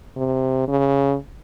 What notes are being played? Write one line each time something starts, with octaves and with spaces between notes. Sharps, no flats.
C3
C#3